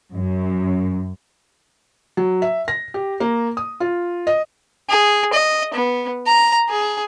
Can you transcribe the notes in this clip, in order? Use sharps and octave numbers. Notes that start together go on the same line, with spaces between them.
F#2
F#3
E5
A#6
G4
A#3
D#6
F4
D#5
G#4
D#5
B3
A#5
G#4